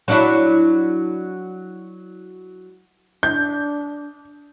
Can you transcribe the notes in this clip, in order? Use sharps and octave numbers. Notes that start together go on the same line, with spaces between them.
F#3 D4 E4
D4 G6